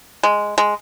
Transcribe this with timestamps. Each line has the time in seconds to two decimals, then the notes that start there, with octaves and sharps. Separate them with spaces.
0.23 G#3
0.58 G#3